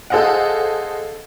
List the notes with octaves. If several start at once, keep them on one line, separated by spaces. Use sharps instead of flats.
G#4 A4 C5 D#5 F5 F#5